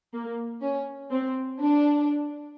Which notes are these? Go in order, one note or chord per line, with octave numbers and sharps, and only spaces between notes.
A#3
C#4
C4
D4